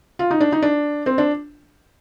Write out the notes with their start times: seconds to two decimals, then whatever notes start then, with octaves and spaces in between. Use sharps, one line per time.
0.19 F4
0.31 D#4
0.40 D4
0.52 D#4
0.62 D4
1.06 C4
1.18 D4